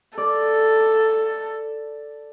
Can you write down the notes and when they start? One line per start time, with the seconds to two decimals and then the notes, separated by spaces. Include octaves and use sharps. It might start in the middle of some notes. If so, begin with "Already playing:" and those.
0.18 A4 D5